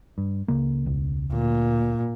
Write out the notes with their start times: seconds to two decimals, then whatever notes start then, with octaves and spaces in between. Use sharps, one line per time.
0.18 G2
0.48 C#2 C#3 A#3
0.85 E1 C#2
1.33 D2 A#2